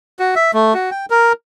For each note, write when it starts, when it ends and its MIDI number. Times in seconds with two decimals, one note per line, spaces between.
0.19 0.34 66
0.36 0.51 76
0.54 0.74 57
0.74 0.90 66
0.91 1.06 79
1.10 1.33 70